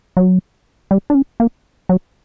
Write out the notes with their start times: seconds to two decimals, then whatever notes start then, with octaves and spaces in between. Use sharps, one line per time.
0.17 F#3
0.91 G3
1.10 D4
1.15 C#4
1.40 A#3
1.89 F#3